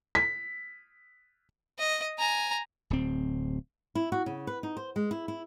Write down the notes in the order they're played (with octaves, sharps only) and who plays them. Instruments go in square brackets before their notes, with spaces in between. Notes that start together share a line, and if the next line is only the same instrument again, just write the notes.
[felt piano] B6
[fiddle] D#5
G#5 A#5
[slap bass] D1 C4
[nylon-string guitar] E4
F#4
C#3
B4
D#4
C5
G#3
E4
E4